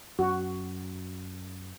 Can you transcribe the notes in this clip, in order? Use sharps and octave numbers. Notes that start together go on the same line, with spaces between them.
F#2 F#4